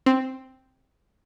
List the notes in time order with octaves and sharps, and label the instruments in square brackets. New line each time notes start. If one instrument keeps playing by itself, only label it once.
[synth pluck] C4